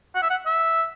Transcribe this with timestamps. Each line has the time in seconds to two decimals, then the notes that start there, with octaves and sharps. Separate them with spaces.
0.15 F#5
0.22 E5
0.30 F#5
0.46 E5